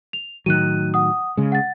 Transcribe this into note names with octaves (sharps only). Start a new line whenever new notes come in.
F7
A2 D#3 F#3 F#6 D#7
F#5 D#6
C#3 G#3
F#5 A6